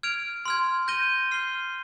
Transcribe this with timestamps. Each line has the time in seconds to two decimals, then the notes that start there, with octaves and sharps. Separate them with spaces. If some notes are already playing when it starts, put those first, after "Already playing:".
0.03 F6 G#6 D7 F7
0.45 C6 F6 G#6
0.88 G6 A#6 D#7 G7
1.31 F6 C7 G7